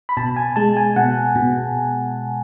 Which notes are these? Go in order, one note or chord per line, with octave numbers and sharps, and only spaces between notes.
B5
B2 A5
G#5
G#3 A5
G#5
B2 F#5
B2